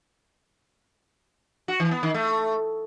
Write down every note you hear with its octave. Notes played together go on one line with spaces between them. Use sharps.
F#4
E3
B3
D#3
A3